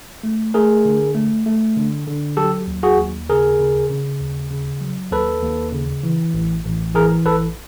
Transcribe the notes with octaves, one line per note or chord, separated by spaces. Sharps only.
A3
A3 G#4 A#4
D3
A3
A3
D3
D3
F#3 G4 A4
D#2
F#4 G#4
D#2
C#3 G#4 A#4
C#3
C#3
D#2
C#3
F#3
D#2 A4 B4
D#2
C#3
E3
A1
A1
E3 G#4 A#4
A1 A4 B4